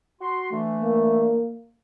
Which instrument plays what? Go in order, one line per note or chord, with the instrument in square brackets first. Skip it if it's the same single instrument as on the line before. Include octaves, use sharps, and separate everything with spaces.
[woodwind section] F#4 C6
D3 E3 A3
[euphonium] A#3